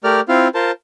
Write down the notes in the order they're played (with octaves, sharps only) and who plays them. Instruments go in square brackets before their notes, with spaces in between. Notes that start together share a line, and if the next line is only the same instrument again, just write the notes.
[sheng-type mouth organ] A3 G4 A#4 D5 F6
C4 E4 F4 F5
F4 A#4 C5 A5